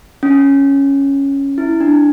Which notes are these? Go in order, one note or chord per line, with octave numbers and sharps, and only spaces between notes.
C#4
E4
D4